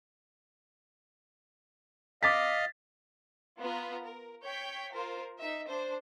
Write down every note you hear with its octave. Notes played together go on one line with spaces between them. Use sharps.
D#5 F5 D6 A6 B6
B3 F4 B4 A#5
A#4
C#5 G5 G6 B6
F4 A#4 C5
D#4 E5
D4 C5